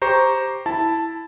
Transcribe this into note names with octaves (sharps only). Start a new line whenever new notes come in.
G4 C5 A#5 C#6
E4 A5